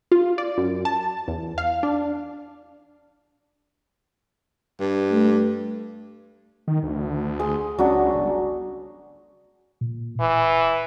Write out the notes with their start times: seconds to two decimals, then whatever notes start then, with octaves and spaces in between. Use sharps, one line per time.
0.12 F4
0.38 D5
0.58 F#2
0.85 A5
1.28 E2
1.58 F5
1.83 D4
4.80 G2
5.12 A3
6.68 D#3
6.83 D2
7.40 G#4 C6
7.79 C#2 F#3 C#4 D4
8.15 G1
9.81 A#2
10.21 D1 E3